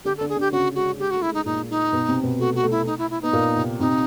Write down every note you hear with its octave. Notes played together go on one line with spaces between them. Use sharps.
D3 D4 G4
A4
D3 D4
G#4
D3 D4
G4
C#3 C#4 F#4
G#3 F#4
G#3 G4
F#4
A3
E4
G#3
D#4
A#2 A#3 D#4
D#4
B2 B3
C3 C4
B2 B3
A3 F#4
F#4
A3
E4
D#4
E4
E4
B3 D#4
A#2 A#3
C3 C4
C3 C4 D#4